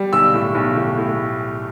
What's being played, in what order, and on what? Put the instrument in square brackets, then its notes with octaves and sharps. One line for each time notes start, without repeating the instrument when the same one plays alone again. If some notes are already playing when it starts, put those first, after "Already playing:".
Already playing: [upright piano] G3
B1 E6
A2
B1
A2
A2